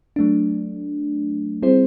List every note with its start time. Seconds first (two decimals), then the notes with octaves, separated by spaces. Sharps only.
0.16 F#3 A3 D4
1.62 G3 C4 E4 G#4 C5